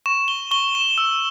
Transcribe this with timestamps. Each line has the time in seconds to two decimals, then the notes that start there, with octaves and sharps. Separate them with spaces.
0.06 C#6 E7
0.28 G7
0.51 C#6 G7
0.75 E7
0.98 E6